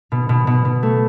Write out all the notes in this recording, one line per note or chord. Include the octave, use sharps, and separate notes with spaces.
B2
B2
B2
B2
A3